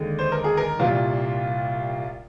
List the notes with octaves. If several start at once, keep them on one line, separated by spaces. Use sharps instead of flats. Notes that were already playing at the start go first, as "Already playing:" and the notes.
Already playing: D#2 D3 G#3
C5
A#4
G#4
A#4
C2 A#2 G3 F4